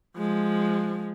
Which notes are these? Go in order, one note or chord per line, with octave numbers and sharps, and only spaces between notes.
F3 G#3